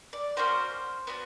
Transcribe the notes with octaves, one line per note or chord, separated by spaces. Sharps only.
D5
A#3 C#4 F#4 C5
B3 D4 F#4